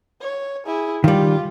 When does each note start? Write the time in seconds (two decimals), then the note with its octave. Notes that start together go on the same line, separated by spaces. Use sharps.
0.21 C#5
0.66 E4 G#4
1.04 D#3 G3 F4 G4